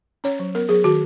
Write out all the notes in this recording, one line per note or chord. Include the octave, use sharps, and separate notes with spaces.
C#4 C#5
F#3
B3 A#4
F#3 G#4
D#3 F#4